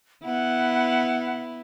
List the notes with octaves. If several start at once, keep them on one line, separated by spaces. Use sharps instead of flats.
B3 E4 F#5